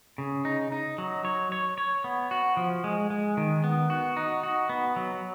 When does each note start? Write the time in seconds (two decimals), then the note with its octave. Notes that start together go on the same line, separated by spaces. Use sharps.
0.18 C#3
0.45 D#4
0.72 D#4
0.98 F#3
1.25 C#5
1.52 C#5
1.78 C#5
2.04 B3
2.31 F#4
2.57 F3
2.84 G#3
3.10 G#3
3.37 D#3
3.64 B3
3.90 F#4
4.17 D#4
4.43 F#4
4.69 B3
4.96 F#3